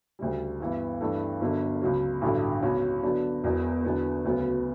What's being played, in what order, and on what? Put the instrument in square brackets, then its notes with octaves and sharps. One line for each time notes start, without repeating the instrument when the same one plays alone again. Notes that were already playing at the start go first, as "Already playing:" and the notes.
[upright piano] D2 C#3 G3
G2 E3 B3
G2 E3 A3 D4
G1 F#2 D3
C#2 C#3 F#3
A1 G2 D3 F#3 A3
C#2 B2 F#3 C#4 F#4
D3 F#3 B3 D4
E1 E2 B2 F#3 B3
E2 D3 F#3 B3
D2 C#3 F#3 B3